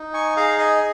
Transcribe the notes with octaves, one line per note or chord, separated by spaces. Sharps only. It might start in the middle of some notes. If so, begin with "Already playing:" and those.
Already playing: D#4
G#5 C#6
G#4 F5 A#5
D#5 G#5